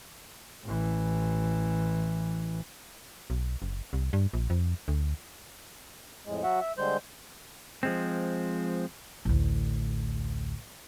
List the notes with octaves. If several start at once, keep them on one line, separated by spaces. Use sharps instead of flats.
A1 E3
B1
F#1
C2
G2
A#1
F2
D2
F2 A2 G#3
F#3 F#4 E5 F#5
E5
D3 G3 G#3 C5 G6
F3 G#3 C4
A1 D2